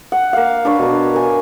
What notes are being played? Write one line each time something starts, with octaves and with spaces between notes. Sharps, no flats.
F#5
A#3 F5
D4 B4 C#5
B2 A#4
A#4 G#5